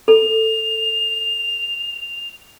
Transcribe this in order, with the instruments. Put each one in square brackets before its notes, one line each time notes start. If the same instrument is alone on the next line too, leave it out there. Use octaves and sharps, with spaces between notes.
[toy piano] A4 [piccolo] F7